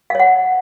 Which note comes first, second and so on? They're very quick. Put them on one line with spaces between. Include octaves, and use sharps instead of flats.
F5 C#5 F#5